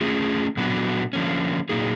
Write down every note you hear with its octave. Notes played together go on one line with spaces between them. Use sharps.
A3 C#4 F4 G#4
A#2 F#3 B3 D4 F#4
D3 F3 A#3 C#4
A#2 F#3 A#3 D#4 G#4